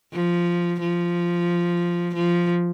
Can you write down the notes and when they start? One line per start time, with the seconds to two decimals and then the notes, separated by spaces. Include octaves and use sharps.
0.13 F3
0.80 F3
2.14 F3